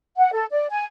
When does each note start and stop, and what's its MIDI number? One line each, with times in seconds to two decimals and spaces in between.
0.17 0.30 78
0.32 0.45 69
0.51 0.66 74
0.70 0.84 80